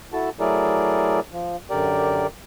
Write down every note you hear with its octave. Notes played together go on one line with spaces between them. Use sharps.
E4 F#4 A4 A5
F#3 A3 E4 G#4 A#4 D5
F3
F#2 D3 G4 A#4 D5